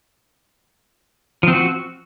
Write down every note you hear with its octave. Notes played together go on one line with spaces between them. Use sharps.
F3 C4 F#4